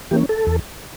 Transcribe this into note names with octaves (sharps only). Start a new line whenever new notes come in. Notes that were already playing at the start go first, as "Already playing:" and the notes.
E3 A#3 C#4 G4
A4
E2